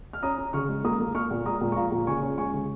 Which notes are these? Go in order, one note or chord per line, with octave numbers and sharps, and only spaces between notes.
F6
C#4 A#5 D#6
C#4
C#3 C#6 F6
G#3
A#3 A#5 D#6
A#3
A#3 C#6 F6
A#2
G#3 A#5 D#6
A#2
C#6
F3 F5 A#5
A#2
C#3 G#5 C#6
C#4
G#3 G#5 C#6
C#3